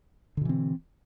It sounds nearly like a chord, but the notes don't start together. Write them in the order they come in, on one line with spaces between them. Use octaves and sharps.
D3 B2 E3 C4